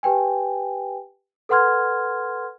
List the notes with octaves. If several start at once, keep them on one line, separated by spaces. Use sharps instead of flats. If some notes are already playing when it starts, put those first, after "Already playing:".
G4 B4 G5 G#5
A4 B4 F#5 C6 F6 G#6